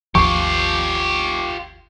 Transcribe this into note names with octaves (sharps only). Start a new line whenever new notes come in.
G#1 D#2 F3 F4 G4 C#6